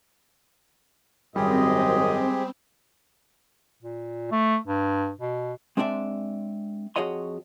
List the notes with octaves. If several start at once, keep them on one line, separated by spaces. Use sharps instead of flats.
G#1 F#2 G3 G#3 C4 G4 G#4 D#5
A#2
A3
G2
B2
G#3 C4 D4 D5 E5
F2 F#4 G#4 C#5 D#5 C6